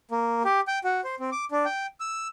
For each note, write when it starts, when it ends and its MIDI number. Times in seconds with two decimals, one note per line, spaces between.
0.11 0.43 58
0.45 0.60 67
0.68 0.79 79
0.84 1.01 66
1.04 1.15 72
1.20 1.30 60
1.32 1.45 86
1.51 1.65 62
1.65 1.86 79
2.00 2.28 88